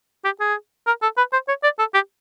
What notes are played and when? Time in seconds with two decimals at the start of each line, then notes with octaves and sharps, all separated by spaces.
0.25 G4
0.40 G#4
0.87 A#4
1.02 A4
1.17 B4
1.33 C5
1.48 C#5
1.63 D5
1.79 A4
1.94 G4